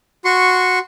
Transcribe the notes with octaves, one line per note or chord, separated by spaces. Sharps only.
F#4 C6 C#6